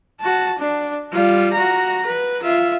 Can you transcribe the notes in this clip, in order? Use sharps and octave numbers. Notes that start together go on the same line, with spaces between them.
F#4 A5
D4
G3 F4
F#4 A#5
B4
F4 E5